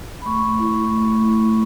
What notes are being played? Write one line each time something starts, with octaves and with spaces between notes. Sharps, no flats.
B5
A3 C#6
A3
E4
E4
A3
A3
E4
E4